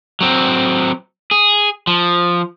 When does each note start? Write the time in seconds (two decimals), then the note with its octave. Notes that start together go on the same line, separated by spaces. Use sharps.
0.21 F#3 C4
1.31 G#4
1.87 F3